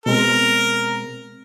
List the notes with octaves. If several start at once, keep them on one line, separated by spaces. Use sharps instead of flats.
B2 G#3 C4 A#4